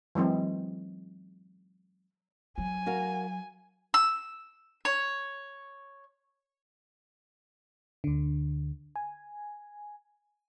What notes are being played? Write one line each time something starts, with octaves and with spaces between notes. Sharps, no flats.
E3 F#3 G#3 C4
F#3 G#5
F#4 A#4 F5
E6
C#5
D2 D3
G#5